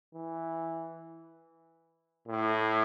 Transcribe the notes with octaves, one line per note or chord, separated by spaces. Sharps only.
E3
A2